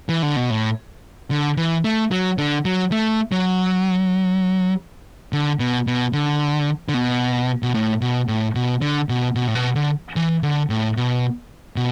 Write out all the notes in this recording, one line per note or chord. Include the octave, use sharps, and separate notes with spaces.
E3
D3
B2
A2
D3
E3
A3
F#3
D3
F#3
A3
F#3
D3
B2
B2
D3
D3
B2
B2
A2
B2
A2
B2
D3
B2
B2
A2
B2
D3
E3
D3
A2
B2
B2